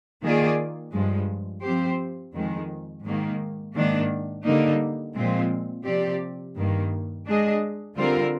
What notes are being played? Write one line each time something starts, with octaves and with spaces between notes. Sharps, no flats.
D#3 A#3 F4 G#4 D5
G2 F3 G#3
F3 C4 G4 C5
F2 D#3 G#3
G#2 D#3 A#3
G#2 D#3 A#3 D4
D3 G3 A#3 D#4
A#2 F3 G#3 C4
C3 F3 C4 G4 D5
G2 D#3 A#3
G#3 D4 G#4 D#5
D3 G3 C4 F4 A#4